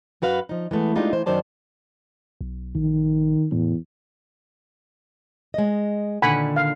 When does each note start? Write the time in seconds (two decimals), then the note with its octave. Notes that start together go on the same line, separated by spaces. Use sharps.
0.22 F#2 F#4 B4 F5
0.49 F3 D#4
0.71 E3 G#3 A3 B3
0.95 G#3 A3 D4 D#4 F4 G4
1.13 E3 C5
1.26 F#2 D#3 F#3 C5 D5 A5
2.41 B1
2.75 A#1 D#3
3.52 E2 A2
5.54 G#3 D#5
6.22 A#2 D3 D#3 F#5 G#5 B5
6.56 F5